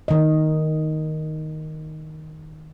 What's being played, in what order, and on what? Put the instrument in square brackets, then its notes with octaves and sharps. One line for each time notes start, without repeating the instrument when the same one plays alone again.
[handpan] D#3 D#5